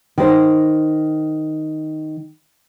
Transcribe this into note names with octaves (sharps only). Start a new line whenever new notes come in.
D#3 C5